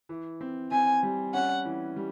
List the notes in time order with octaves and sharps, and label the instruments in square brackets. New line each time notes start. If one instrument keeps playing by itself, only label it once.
[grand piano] E3
C4
[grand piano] C4 [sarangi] G#5
[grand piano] G3
[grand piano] C#4 [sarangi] F#5
[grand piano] E3
G3